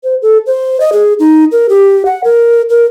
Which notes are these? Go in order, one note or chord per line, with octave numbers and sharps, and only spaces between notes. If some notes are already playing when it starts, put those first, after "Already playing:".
C5
A4
C5
D#5
G#4
D#4
A#4
G4
F#5
A#4
A#4